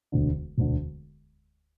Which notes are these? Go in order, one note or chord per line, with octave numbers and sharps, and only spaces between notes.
E1 D2 D3
E1 D2 D3